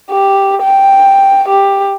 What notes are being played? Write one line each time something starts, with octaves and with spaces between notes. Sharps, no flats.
G4
G5
G4